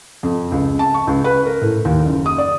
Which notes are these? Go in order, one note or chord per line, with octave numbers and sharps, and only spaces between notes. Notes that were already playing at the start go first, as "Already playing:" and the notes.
F2
C#2
A5
C#6
C#2
B4
A#4
A2
D#2
F#1
D#6
D5